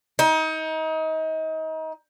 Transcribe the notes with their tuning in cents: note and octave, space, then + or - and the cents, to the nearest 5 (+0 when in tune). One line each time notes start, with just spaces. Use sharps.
D#4 +30